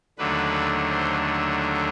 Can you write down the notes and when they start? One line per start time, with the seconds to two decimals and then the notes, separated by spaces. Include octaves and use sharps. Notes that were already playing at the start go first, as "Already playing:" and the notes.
0.18 D#2 D3 F#3 A3 D4 B4
0.90 C5